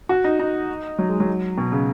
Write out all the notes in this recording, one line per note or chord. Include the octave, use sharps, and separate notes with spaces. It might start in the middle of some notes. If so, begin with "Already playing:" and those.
F#4
D#4
D#4
F#3
G#3
F#3
B2
C#3